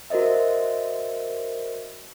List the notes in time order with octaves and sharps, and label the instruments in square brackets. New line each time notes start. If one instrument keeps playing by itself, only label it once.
[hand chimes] F#4 A#4 C5 D#5 E5